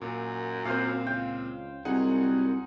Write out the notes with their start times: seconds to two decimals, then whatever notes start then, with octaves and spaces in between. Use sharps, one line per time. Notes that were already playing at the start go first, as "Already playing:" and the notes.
0.01 F#2 A#2
0.65 A#2 C4 C5 F5
1.07 C#2 G5
1.85 C2 F#2 D#4 G#4 F#5